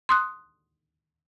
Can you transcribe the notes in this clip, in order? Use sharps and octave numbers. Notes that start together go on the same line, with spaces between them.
C6 D#6 F#6